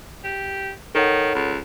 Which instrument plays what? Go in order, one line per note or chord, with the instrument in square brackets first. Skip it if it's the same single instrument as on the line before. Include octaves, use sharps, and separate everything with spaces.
[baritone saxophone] G4
[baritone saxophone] D#3 [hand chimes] A4 C#5 F#5
[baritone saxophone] C#2